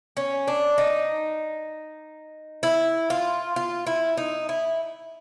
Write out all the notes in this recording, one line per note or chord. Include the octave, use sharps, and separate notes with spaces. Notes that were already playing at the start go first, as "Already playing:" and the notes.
C#4
D4
D#4
E4
F4
F4
E4
D#4
E4